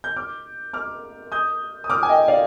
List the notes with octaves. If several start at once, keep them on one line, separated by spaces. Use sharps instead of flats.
G6
D6 F6
D6 F6
D#6 G6
D#6
D6 F6
G#5
D#5 G5
D5 F5